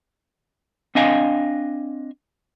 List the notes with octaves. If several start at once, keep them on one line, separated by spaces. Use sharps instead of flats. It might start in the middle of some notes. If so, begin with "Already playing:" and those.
C4 D4 D#5 F5 G#5